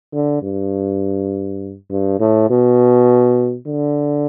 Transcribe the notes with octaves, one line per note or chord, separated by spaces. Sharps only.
D3
G2
G2
A2
B2
D3